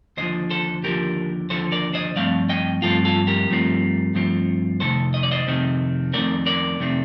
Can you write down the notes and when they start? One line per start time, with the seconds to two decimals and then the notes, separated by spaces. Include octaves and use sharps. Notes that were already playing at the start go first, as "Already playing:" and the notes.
0.17 D#2 D3 F3 C5 D#5
0.50 A4 C5
0.83 D#2 D3 F3 G4 A#4
1.49 D#2 D3 F3 A4 C5
1.72 A#4 D5
1.94 C5 D#5
2.16 G2 F3 A3 C4 D5 F5
2.49 D#5 G5
2.82 G2 F3 A3 C4 F4 A4
3.05 F4 A4
3.27 G4 A#4
3.49 G2 F3 A3 C4
4.14 G2 F3 A3 C4
4.80 F2 C3 D#3 A3 A4 C5
5.14 D#5
5.23 D5
5.31 C5 D#5
5.47 F2 C3 D#3 A3 C4
6.13 F2 C3 D#3 A3 C4 A#4 D5
6.46 A#4 D5
6.80 F2 C3 D#3 A3 C4